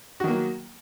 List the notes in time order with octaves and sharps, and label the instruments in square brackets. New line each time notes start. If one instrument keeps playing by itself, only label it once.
[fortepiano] F#4
D#3
A#3
F#3